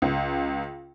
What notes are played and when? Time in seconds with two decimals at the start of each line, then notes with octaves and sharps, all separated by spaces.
0.02 C#2